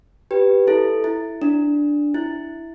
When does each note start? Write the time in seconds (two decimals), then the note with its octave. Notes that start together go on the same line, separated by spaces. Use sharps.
0.31 G4 B4
0.67 E4 A4
1.04 E4
1.42 D4
2.14 E4